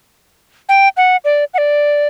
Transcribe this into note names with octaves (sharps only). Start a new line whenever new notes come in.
G5
F#5
D5
F#5
D5